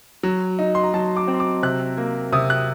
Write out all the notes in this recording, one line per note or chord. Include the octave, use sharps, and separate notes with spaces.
F#3
D#4
C6
A#5
F#3 A5
D6
C4
C6
D6
C3 F#6
A#3
C3 D#6
F#6